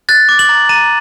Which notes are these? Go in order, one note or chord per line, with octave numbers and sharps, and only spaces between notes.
F#6 A6
D6
F#7
A#5
A#5 D#7